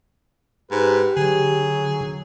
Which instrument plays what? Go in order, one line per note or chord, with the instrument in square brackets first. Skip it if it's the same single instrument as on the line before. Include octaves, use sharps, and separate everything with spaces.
[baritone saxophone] G#2 [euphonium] G4 [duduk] B4
[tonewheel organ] D3 [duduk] F#3 [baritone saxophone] G#4